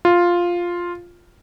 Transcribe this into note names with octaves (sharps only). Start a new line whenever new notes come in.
F4